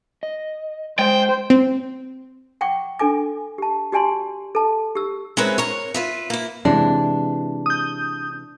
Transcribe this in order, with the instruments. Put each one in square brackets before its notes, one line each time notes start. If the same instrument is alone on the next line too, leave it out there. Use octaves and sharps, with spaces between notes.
[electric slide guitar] D#5
[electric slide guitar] G#3 [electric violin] C5 [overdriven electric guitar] G5
[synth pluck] C4
[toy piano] F#5 G5 C#6 D6
D4 A4 G#5 D6
G4 A5
F#4 G4 D5 G#5 A5 C6
A4 A5
G4 E6
[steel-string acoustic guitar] G#3 C4 C#4 A#4 B4 E5
A#4 C#5
F4 B4 E5
A#3 E4
[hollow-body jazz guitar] C3 E3 G#3 [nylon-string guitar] D4
[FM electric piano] D#6 G6